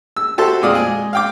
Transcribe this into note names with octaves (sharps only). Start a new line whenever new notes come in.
E6
F#4 G4 A4 C5 E5 A5
F2 A#2 G#3 D5 F5 D#6
G#3 G#4
F5 G5 D6